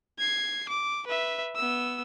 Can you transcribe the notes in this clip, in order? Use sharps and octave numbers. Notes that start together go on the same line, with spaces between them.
G#6 C7
D6
B4 E5
B3 E6